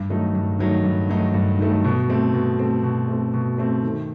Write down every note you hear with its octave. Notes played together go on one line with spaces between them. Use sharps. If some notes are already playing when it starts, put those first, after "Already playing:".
Already playing: G2
D#3 F#3 A3 D#4
G2
D#3 F#3 A3 D#4
G2
D#3 F#3 A3 D#4
G2
D#3 F#3 A3 D#4
B2
A3 C4
B2
A3 C4
B2
A3 C4
B2
A3 C4
D#3